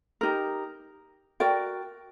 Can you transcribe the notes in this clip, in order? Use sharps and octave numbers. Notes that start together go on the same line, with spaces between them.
D#4 G4 A#4
F#4 A#4 D5 G5